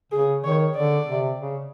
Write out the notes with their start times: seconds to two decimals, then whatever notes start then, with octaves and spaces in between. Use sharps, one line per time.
0.12 C#3 G#4
0.44 D#3 C#5
0.76 D3 D5
1.08 C3
1.41 C#3